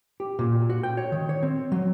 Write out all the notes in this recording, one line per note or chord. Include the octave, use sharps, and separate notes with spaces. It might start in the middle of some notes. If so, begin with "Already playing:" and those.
G4
A#2
F#4
G5
C#5
D#3
C#5
C4
F#3